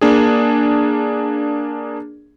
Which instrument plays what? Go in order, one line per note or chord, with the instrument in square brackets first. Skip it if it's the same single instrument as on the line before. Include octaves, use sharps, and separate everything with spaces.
[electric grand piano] A#3 D4 G#4